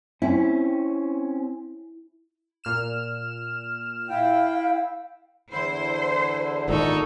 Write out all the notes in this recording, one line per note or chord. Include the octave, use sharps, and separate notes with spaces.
C4 C#4 E4
A#2 F6 E7
E4 F5 G5
E2 D3 E4 C5
G#1 A#2 D#4 A4 C#6